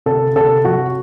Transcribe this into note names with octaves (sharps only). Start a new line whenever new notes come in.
C3 A4
C3 A4
F#3 F#4